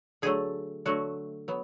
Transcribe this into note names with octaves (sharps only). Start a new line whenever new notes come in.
D3 F#3 A3 G#4
D3 F#3 A3 F#4
F#3 B3